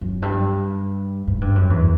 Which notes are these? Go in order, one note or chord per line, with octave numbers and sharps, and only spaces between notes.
F#2
G2
G#2
G2
F#2
E2